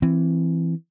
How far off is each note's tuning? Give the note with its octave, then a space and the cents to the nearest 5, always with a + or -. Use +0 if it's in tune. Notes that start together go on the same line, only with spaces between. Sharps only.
E3 +10 C4 +0